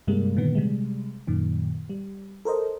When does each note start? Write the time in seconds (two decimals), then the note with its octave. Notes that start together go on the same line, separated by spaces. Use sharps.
0.07 G2 C3 G3 G#3 A#3
0.36 A#2 D3 D#3 B3
0.55 C3 G3 G#3
1.27 F#2 A#2 D#3
1.90 G3
2.45 A4 A#4 C5 D#5